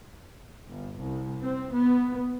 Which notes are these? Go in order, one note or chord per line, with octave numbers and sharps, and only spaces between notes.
G1
C2
C4
B3